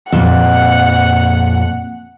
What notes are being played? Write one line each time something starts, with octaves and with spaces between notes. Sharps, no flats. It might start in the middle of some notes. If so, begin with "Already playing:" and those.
F2 A#2 F#5